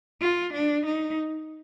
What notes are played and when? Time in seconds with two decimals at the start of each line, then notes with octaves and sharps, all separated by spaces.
0.21 F4
0.53 D4
0.86 D#4